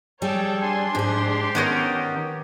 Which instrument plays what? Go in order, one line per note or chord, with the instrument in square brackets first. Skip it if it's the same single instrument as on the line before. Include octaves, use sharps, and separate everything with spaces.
[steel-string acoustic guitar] G3 G#4 [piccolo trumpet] A4 [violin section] C#5 G5 A5
[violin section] D4 C6 [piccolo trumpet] G#5
[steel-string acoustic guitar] G#2 G#4 [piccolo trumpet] G4
[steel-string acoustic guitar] D#3 [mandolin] B3 C#4 A#4